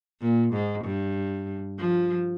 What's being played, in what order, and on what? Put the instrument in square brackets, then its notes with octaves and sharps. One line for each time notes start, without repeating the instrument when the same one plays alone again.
[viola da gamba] A#2
G#2
G2
F3